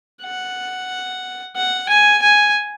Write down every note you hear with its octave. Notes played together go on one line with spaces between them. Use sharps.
F#5
F#5
G#5
G#5